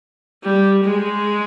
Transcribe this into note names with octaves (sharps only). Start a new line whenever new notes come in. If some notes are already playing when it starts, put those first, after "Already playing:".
G3
G#3